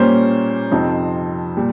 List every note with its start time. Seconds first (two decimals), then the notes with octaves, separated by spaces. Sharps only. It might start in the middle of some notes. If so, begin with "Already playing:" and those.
Already playing: A#2 G3 A#3 C#4 C5
0.71 F2 C3 F3 C4 D#4
1.57 A#2 G3